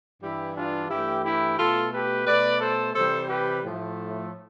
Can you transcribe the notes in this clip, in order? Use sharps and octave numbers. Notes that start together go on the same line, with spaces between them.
G2 E3 G3 E4 G4
D4 F4
G2 E3 A3 E4 G4
E4 G4
B2 A3 F4 A4
G4 B4
B2 A3 B4 D5
A4 C5
C3 E3 G3 A4 C5
G4 B4
A2 F3 A3